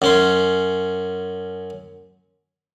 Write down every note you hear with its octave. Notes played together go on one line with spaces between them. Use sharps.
F#2 C#4 C6